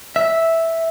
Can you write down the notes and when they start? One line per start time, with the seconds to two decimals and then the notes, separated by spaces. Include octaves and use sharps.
0.16 E5